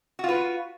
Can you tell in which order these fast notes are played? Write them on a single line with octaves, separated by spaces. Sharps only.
F#4 F4 B4